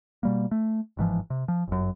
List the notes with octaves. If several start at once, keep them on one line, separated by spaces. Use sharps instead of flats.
B2 G3 A#3
A3
G1 G#2 E3 F3
C3
F3
G1 F#2